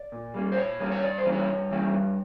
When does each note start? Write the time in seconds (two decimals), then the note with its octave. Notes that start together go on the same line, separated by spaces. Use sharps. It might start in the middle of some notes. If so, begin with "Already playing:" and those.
Already playing: D5
0.12 A#2
0.34 G3 A#3 C#4
0.52 C5
0.57 A#2 C#5
0.80 G3 A#3 C#4
0.92 C#5
1.02 G2 D5
1.18 C5
1.25 E3 G3 A#3 C#4
1.32 C#5
1.48 G2
1.71 E3 G3 A#3 C#4
1.94 G2